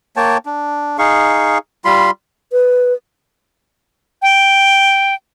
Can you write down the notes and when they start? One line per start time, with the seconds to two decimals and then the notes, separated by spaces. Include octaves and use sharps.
0.16 A#3 C#5 G5 A5
0.46 D4
0.98 D#4 G#4 F5 C#6
1.85 G3 F4 B5 C6
2.52 B4
4.22 G5